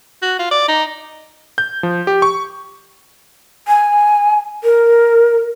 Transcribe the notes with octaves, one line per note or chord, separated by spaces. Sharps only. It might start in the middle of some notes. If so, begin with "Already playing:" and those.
F#4
F4
D5
D#4
G6
F3
G4
C#6
G#5
A#4